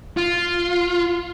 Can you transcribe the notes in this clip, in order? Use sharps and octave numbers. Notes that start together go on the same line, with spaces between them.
F4